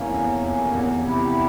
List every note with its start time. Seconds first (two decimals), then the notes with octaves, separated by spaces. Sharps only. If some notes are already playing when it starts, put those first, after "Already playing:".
Already playing: F1 E2 E3 A#3 C#4
0.14 E2
0.45 F1
0.75 E2
1.04 C3 E4 G4